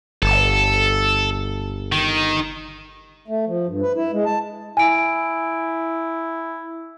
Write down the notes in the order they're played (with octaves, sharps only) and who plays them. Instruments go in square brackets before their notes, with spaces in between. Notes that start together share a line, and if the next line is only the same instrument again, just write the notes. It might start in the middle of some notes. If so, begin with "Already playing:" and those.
[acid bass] G1 [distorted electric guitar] A4
[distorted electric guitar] D#3
[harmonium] A3
F3
G2
B4
E4
G#3
A5
[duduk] E4 [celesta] G#5 D7